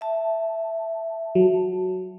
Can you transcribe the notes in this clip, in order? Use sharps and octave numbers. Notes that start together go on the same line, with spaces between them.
E5 A5
F#3